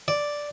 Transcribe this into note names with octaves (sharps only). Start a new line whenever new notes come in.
D5